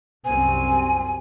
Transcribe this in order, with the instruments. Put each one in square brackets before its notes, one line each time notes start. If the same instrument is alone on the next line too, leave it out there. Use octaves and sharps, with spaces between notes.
[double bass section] C2 F#2 C4 [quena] G#5